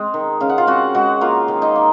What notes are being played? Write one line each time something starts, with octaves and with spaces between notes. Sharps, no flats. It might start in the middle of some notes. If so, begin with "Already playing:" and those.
Already playing: G#3 C4
D#3
C#3 F5
F#5
F4 F5
C4 F#4 F#5
G#3 F#4 F#5
A#3 F4 F5
D#3
D#4 D#5
A#3